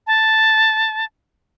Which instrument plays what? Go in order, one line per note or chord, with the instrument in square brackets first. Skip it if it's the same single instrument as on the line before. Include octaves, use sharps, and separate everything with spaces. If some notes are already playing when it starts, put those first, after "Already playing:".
[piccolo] A5